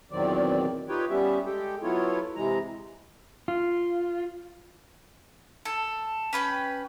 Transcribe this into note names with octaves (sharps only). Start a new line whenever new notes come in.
E2 A#2 D#3 F#3 C4 D5
D#4 F4 G4 B4 C#5 G5
G3 B3 C#4 G4 E5
G#3 G4 A4 G5
F#3 B3 E4 F4 A4 C#5
C3 E3 G#3 A#5
F4
A4
C#4 B4 G5